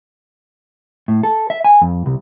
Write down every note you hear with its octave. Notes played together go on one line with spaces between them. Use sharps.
A2
A4
E5
G#5
F2
C2